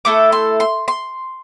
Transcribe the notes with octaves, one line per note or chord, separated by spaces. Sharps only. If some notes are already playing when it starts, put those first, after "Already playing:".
A3 E4 A4 D6
C6
C6
C6